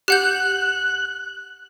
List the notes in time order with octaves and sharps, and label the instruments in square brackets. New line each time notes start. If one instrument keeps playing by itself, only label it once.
[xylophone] G4 F#5 G6 [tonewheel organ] F#6